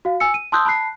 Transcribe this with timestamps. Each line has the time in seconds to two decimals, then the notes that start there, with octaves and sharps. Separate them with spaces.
0.05 F#4 F5
0.20 G#5 E6 C#7
0.34 D#7
0.52 A5 C6 D#6 E6 F#6 G6
0.65 A5 B5 F#6 C7